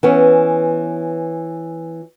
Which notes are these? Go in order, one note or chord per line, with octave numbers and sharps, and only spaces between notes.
E3 B3 C#4